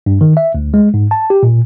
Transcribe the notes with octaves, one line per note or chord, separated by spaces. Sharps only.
G2
D#3
E5
D2
G#3
G#2
A5
G4
A#2